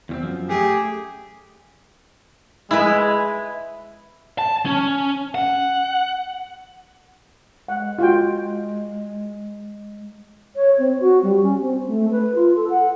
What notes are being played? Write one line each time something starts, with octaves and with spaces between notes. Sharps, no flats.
E2 G3 C4
F#2 F3
A3 G4 G#4
G#3 E4 B4
A5
C#4
F#5
G#3 F#5
F4 F#4 G5
C#5
C4
F#4
G3
C#4
C4
A3
B4
F4
A4
F#5